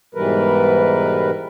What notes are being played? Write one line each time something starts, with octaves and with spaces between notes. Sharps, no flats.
G#2 B2 E3 G3 A#4 B4